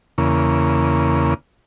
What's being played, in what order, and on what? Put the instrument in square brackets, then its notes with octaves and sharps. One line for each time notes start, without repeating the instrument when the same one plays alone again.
[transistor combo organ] E2 C#3 A#3